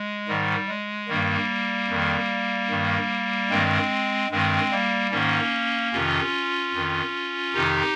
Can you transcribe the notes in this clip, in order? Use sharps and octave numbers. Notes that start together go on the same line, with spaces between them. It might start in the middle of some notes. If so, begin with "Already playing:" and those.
Already playing: G#3
G#2 D#3 G3
G#3
G2 D#3 G3 A#3
F2 D#3
G2 D#3
G2 D#3 G#3 C4
G2 D#3 G#3 C4
G3 A#3
G#2 D#3 A#3 C#4
F2 C3 D#3 C#4 F4
F2 D#3
F2 C3 D#3 D#4 G4